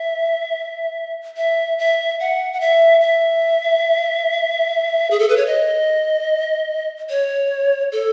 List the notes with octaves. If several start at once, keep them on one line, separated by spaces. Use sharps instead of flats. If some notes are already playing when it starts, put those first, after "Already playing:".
Already playing: E5
E5
E5
F#5
F#5
E5
E5
G#4
A4
B4
C#5
D#5
C#5
A4